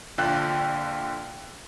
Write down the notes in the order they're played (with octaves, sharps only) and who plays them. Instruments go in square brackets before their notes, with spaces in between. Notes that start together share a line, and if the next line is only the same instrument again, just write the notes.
[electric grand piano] A#1 D3 F4 G5 F#6